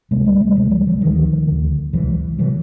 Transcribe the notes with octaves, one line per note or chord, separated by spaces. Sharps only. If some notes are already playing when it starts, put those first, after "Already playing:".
C#2 C3 G#3 A#3
G3 A3
G3 A3
C#2 C3 F#3 G#3
F3 G3
E3 F#3
D2 D3 D#3 F3
D2 D3
C#2 C3 E3 F#3
C3 E3 F#3